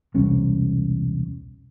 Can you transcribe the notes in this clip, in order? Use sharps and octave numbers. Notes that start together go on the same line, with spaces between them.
E1 C2 C#4